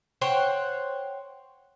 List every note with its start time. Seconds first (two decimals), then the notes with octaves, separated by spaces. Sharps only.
0.21 C5 C#5 F#5 G5